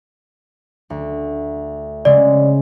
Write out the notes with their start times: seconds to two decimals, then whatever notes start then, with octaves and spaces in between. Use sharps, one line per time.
0.90 D2
2.05 C#3 G#3 D5